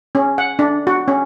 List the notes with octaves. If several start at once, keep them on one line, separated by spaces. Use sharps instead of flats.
C#4
F#5
D4
F#4
C#4